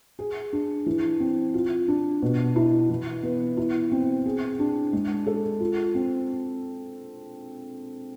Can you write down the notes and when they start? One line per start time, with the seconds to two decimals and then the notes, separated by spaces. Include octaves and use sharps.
0.19 G#4
0.53 D4
0.86 E3
1.20 C4
1.54 F4
1.88 D4
2.22 B2
2.56 E4
2.90 E3
3.23 B3
3.57 E4
3.92 C4
4.26 G#4
4.59 D4
4.93 G#3
5.27 A4
5.60 F4
5.95 C4